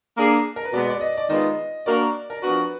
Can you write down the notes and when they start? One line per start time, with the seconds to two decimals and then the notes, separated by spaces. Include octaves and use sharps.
0.17 A#3 D4 G#4
0.56 A#4
0.64 B4
0.72 B2 G#3 B3 D5
0.90 D5
1.01 D#5
1.17 D5
1.29 D#3 G#3 B3 F4 D#5
1.86 A#3 D4 F#4 A#4 D5
2.30 A#4
2.42 F3 B3 D4 F#4 A#4 B4